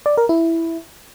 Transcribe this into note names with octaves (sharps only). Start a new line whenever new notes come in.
D5
A#4
E4